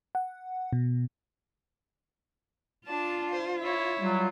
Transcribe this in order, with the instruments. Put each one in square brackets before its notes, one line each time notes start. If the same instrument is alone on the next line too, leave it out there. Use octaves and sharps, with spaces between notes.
[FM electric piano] F#5
B2
[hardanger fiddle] D4 A5 [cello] F4
[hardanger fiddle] C5
E4 C#5
[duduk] F#3 [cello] G3 F4